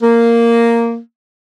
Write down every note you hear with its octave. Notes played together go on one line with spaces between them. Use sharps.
A#3